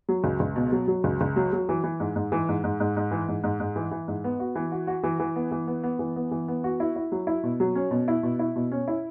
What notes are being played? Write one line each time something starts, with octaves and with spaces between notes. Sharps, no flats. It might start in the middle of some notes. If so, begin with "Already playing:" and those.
F#3
C#2
C#2
B2
F#3
F#3
C#2
C#2
F#3
F#3
E3
E3
G#2
G#2
E3
G#2
G#2
G#2
G#2
E3
G#2
G#2
G#2
E3
E3
G#2
B3
F#4
E3
F#4
F#4
E3
E3
B3
E3
B3
B3
E3
B3
E3
B3
F#4
E4
E4
F#3
E4
B2
F#3
C#4
B2
E4
B2
E4
B2
C#4
E4